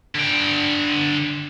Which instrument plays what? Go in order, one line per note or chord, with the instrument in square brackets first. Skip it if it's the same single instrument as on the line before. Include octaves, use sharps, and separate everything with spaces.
[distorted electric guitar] D3 G5